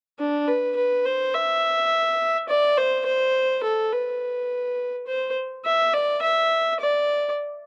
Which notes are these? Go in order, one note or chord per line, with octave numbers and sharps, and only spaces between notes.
D4
B4
B4
C5
E5
D5
C5
C5
A4
B4
C5
E5
D5
E5
D5